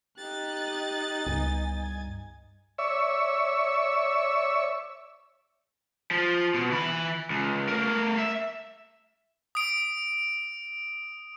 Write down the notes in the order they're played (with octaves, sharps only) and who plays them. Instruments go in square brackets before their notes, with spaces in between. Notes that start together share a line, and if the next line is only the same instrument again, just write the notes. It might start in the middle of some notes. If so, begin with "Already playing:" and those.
[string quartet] D#4 D#5 A6 [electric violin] G4 F#6
[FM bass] C#2 [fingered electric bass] G2 [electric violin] B3 G#5
[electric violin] G#5 G#6
[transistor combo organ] C#5 D5 E5 C#6 E6
[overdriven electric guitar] F3
B2
E3 B5
C#2
A3 A#4
E5
[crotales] D#6 D7